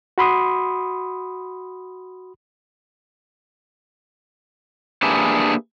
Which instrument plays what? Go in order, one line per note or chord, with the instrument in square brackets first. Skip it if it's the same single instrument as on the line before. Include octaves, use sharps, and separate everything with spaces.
[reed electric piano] F#4 B5 C6 D#6
[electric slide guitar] A#3 D4 G4 G#4 B4 E5